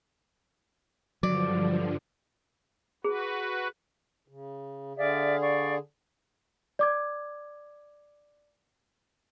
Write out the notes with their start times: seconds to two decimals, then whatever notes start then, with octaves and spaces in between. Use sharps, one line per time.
1.23 G2 D3 F3 F#3 D5
3.04 F#4 G#4 B4
4.28 C#3
4.97 D3 G#4 D5 E5 F5
5.41 D5 F5 C#6
6.79 D5 D6 G#6